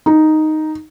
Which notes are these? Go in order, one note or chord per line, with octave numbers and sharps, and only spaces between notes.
D#4